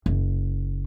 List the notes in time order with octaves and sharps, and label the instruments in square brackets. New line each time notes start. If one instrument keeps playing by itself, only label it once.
[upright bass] F#1